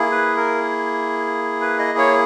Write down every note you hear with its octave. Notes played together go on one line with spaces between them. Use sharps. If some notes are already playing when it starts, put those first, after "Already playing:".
Already playing: A#3 E4 G#4
B4
A#4
B4
D#5
C#5